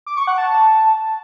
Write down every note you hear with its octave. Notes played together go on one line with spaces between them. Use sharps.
D6
C#6
F#5
A5